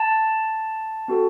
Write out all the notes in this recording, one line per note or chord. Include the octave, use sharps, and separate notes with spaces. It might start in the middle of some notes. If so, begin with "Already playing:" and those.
Already playing: A5
C4 F#4 A4